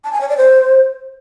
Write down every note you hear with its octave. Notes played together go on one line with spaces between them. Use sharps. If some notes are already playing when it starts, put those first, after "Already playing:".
A5
G#5
C#5
D5
C5